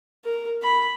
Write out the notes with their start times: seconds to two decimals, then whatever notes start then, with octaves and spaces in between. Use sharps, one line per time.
0.24 A#4
0.62 B5